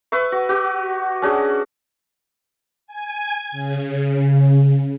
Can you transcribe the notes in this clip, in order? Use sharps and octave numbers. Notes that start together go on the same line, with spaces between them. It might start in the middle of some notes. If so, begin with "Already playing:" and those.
B4 E5 C#6
F#4
F#4 G4
C#4 D4 F#4 G#4
G#5
C#3